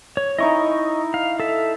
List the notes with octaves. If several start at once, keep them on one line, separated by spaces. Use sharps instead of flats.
C#5
D#4 E4 D#5 C#6
F5
A4 E5